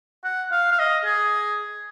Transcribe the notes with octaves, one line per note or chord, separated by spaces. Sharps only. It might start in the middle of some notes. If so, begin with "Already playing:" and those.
F#5
F5
F5
D#5
G#4